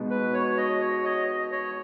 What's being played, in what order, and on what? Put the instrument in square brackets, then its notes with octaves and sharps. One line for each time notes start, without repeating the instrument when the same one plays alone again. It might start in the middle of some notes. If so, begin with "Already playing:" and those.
Already playing: [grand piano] B2 G#3 B3 D#4
[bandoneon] B4
C#5
D#5
C#5
D#5
D#5
C#5